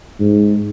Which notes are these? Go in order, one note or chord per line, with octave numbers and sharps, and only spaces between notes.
G#2